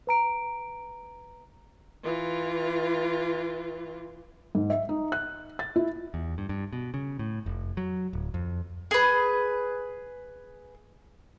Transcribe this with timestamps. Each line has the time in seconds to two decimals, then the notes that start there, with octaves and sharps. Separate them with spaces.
0.07 B4 A#5 D7
2.04 E3 F4
4.55 G#2
4.70 E5
4.89 D#4
5.12 F#6
5.59 A6
5.76 E4
6.14 E2
6.38 G2
6.49 G2
6.73 B2
6.94 C#3
7.19 A2
7.46 F1
7.77 F#3
8.13 D1
8.34 F2
8.91 G#4 B4